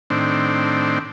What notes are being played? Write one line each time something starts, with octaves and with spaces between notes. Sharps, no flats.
A2 D#3 C4 D4